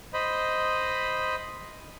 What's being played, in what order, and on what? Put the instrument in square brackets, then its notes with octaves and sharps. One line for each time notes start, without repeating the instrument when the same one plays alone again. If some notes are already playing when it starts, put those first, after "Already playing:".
[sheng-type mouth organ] C5 D#5 B5